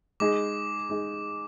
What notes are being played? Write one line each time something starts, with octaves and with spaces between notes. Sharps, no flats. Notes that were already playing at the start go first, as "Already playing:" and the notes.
G#3 D#4 G#4 D#5 D6
G#3 D#4 G#4 D#5